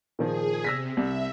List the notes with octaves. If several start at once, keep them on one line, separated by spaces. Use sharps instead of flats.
A#2 D#3 F3 G#4
C3 E6 A#6 B6
C2 E5